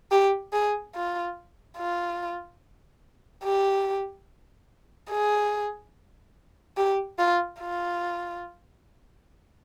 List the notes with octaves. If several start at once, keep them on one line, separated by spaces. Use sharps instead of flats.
G4
G#4
F4
F4
G4
G#4
G4
F4
F4